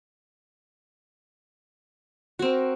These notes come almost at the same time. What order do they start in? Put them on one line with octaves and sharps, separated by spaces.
F#4 C4 A#4